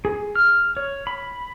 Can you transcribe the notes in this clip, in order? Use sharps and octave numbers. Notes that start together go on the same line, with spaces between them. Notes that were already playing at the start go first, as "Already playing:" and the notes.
G#4
F6
C#5
B5